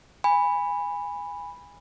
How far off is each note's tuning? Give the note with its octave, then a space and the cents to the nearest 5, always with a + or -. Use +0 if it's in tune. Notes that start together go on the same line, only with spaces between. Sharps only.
G#5 -20 B5 +0